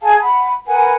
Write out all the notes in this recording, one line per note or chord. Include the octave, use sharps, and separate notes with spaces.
G#4 F5 G#5 A5
F#5 B5
A#4 B4 F#5 G#5